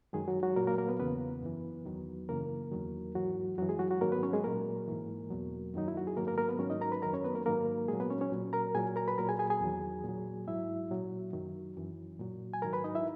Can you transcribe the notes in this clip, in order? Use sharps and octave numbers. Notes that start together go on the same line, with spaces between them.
F#2 D#3 F#3 G#3 G#4
F#3 F#4
F#3 F#4
A#2 F#3 A#3 A#4
A#3 A#4
A#3 A#4
B3 B4
E2 C#3 E3 B3 B4
F#2 E3
E2 D#3 F#3
F#2 C#3 E3 A#3 A#4
E2 D#3 F#3
G#2 E3 F#3 F#4
F#2 E3 F#3 F#4
G#3 G#4
F#3 F#4
F#3 F#4
G#2 D#3 F#3 A#3 A#4
B3 B4
C#4 C#5
G#3 G#4
A#2 F#3 A#3 A#4
G#2 E3
E2 B2 F#3
F#2 D#3 F#3 D#4
E4
F#4
G#4
G#2 D#3 F#3 A#3 A#4
A#3 A#4
A#3 A#4
B3 B4
G#2 D#3 F#3 C#4 C#5
D#4 D#5
A#4 A#5
B4 B5
F#2 D#3 F#3 A#4 A#5
C#4 C#5
B3 B4
A#3 A#4
G#2 D#3 F#3 A#3 A#4
A#2 F#3 G#3 G#4
B3 B4
C#4 C#5
C#4 C#5
A#2 F#3
A#4 A#5
A#2 F#3 G#4 G#5
A#4 A#5
B4 B5
A#2 F#3 A#4 A#5
G#4 G#5
G#4 G#5
G#4 G#5
E2 D#3 F#3
A#2 F#3
G#2 F#3 E4 E5
A#2 F#3
F#2 D#3 F#3
F#2 E3
A#2 F#3
G#5
G#2 D#3 F#3 A#4 A#5
B4 B5
D#4 D#5
E4 E5